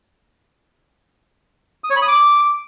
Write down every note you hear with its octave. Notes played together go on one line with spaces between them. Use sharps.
D#6
C#5
B5
D#6
D6